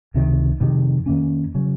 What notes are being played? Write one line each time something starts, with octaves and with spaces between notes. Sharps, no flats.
C#2 C3 D#3
F2 C3 D#3
F2 D#3 A#3 C#4
C#3 F#3